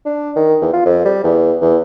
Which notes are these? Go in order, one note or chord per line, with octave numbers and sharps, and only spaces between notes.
D4
D#3
E2
F4
F2
G3
E2
E2